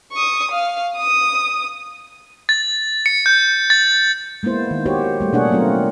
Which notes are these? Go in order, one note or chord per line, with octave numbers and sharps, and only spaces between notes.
C#6 D#6
F5
D#6
A6
C#7
G6
A6
G#3 A#3 B3 E4 C5
D#3
F#4 G4 C5 C#5
G3 A3
B2 A#3 D4 G#4 C#5 F#5
F#3 A3 C4 F4 A#4